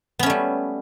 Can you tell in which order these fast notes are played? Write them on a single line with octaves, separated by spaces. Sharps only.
B3 C#4 A3 G3